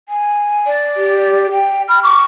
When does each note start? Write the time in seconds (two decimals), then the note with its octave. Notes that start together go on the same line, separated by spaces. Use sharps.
0.09 G#5
0.66 D5
0.97 G4
1.52 G5
1.89 B5 F6
2.03 C#6 D6